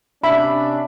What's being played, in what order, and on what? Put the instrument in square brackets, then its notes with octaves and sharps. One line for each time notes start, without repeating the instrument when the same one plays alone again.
[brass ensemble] C3 C#4 D4 [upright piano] E5 [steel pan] B5